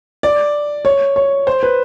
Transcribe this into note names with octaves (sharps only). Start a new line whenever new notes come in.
D5
C#5
C#5
C5
B4